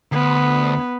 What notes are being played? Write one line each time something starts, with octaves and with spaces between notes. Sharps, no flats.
D2 B3